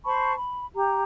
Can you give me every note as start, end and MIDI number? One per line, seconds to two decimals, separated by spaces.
0.05 0.35 72
0.05 0.35 81
0.05 0.35 83
0.05 0.35 85
0.36 0.65 83
0.75 1.04 67
0.75 1.04 82